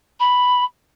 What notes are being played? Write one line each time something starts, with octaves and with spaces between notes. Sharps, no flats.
B5